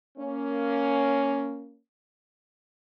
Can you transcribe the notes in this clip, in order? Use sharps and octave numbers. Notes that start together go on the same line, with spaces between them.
A#3 C#4